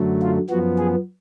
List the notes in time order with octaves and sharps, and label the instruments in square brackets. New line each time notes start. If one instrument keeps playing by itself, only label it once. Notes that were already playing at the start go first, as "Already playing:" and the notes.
Already playing: [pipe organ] F#2 D3 F#3 A3
F4
F#2 F3 B3 F#4
G#4